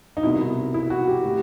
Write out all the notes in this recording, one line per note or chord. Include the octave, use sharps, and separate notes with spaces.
D#4
C2 B2 E4
E4
F#4
G4
A2 G4